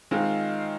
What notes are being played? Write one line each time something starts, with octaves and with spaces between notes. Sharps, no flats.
D#3 G#3 C4 F4